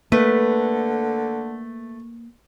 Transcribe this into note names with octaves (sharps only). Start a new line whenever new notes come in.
D3 A3 A#3 B4